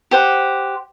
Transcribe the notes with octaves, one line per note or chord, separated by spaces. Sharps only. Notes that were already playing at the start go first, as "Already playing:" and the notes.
G4 C5 F#5